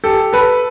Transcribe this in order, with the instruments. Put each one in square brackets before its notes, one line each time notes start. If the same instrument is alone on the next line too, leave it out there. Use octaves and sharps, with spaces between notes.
[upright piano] G4 A4
A4 B4